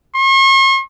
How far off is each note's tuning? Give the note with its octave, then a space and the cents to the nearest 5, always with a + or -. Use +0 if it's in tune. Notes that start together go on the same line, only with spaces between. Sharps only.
C#6 -45